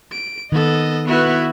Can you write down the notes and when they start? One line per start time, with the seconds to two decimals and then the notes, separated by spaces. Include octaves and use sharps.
0.11 D7
0.52 D#3 B3 A4 D#5
1.07 B3 E4 F#4 B4